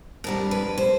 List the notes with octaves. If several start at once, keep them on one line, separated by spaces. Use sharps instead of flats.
F2 D3 G3 A#4
B4
C5